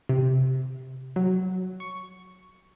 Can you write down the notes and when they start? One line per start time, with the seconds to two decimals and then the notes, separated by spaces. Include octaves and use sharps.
0.09 C3
1.16 F#3
1.80 C#6